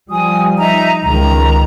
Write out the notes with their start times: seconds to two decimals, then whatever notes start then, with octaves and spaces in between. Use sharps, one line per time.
0.11 F3 G3 G#5 D#6
0.58 D#4 E5 A#5
1.04 C#2 D#3 A#5